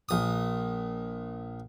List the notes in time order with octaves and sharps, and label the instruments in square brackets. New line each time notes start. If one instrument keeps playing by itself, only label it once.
[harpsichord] A#1 D#6